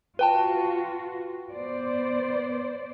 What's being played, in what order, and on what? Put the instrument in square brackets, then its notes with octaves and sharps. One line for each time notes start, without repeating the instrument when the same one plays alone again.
[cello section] F4 F#4 [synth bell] B4 G5 A5
[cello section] B3 C5 D5